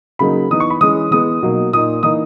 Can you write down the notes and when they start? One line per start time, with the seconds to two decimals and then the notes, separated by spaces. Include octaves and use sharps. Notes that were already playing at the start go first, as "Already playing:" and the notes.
0.19 C#3 F#3 A#3 D#4 B5
0.51 E3 B3 D#4 D#6
0.60 C#6
0.70 B5
0.81 E3 G#3 C#4 D#6
1.11 E3 G#3 B3 D#6
1.43 B2 F#3 A#3 D#4
1.73 A#2 A#3 D#4 D#6
2.03 E3 A#3 D#4 D#6